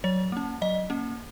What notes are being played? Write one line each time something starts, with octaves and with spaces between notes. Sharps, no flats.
F#3 C#5
A#3 C#4
F#3 D#5
A#3 C#4